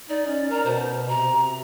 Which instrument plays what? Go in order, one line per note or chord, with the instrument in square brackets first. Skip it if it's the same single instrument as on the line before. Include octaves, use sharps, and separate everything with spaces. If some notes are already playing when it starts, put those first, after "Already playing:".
[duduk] D#4 [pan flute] D5
[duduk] C#4 [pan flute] D5
[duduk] A#4 [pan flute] A#5
[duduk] B2 [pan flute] C5
[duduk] C3 [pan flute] A#5